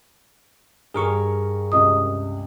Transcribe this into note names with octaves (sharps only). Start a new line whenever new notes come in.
G2 G#4 A#4 C#6
C#2 G2 C3 D#5 D#6